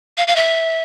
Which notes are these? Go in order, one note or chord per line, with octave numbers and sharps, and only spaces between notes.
F5
F5
E5